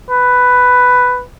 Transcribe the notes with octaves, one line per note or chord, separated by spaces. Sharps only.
B4